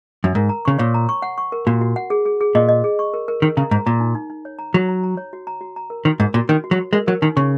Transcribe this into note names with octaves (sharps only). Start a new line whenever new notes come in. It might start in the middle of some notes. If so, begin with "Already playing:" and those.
F#2
G#2 A#4
A#5
C#3 C#6
A#2 C#5
A#5
C#6
F#5
C#6
A#4
A#2 F#4
F#4
F#5
G#4
G#4
G#4
A#2 D#5
D#5
G#4
C#6
A#4
A#4
D#3 A#4
C#3 A#5
G#2 A#5
A#2 A#5
D#4
D#4
D#4
C#5
A#5
F#3 F#4
A#5
A#5
C#5
F#4
A#5
F#4
A#5
A#4
D#3 F#4
G#2 A#4
A#2 F#4
D#3 F#4
F#4
F#3
F#4
G#3 A#4
F#3 A#4
D#3 D#4
C#3 C#6